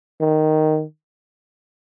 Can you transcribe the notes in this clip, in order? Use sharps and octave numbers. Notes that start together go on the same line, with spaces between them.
D#3